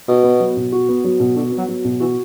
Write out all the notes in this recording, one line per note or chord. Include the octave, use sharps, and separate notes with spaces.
B2 F#4
B3
F#3
B2
F#4
B3
F#3
B2
D3 F#4
B3
F#3
F#3
B2
E3 F#4